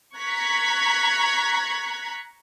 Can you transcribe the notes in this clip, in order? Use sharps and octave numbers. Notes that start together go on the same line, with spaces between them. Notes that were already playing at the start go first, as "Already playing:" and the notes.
A#5 C#6 F#6 G#6 B6